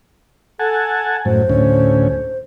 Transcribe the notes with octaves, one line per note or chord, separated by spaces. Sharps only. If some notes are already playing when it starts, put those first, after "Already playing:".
A4 F#5 G#5 A5
F#2 A2 C5
D2 A2 C#4